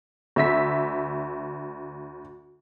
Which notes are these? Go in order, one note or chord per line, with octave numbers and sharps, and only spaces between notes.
D2 E5 B6